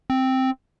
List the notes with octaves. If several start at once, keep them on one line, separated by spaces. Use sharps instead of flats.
C4